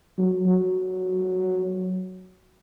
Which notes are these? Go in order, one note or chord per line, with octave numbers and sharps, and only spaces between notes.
F#3
F#3